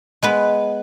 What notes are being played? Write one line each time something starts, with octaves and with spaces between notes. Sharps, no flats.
G#3 B3 B4